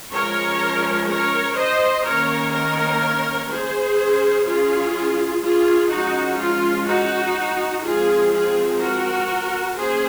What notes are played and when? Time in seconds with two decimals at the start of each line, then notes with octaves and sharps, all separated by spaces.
0.12 F3 G#3 C#4 A#4 C#5
1.08 A#4 C#5
1.57 C5 D#5
2.05 D#3 A#3 C#4 A#4 C#5
2.54 A#4 C#5
3.50 G#4 C5
3.98 F#3 C#4
4.46 F4 G#4
5.43 F4 G#4
5.91 F3 G#3 C#4 D#4 F#4
6.39 F4
6.87 D#4 F#4
7.84 F3 G#3 C4 F4 G#4
8.32 F4 G#4
8.80 F#4 A#4
9.77 F#3 A#3 C#4 G#4 C5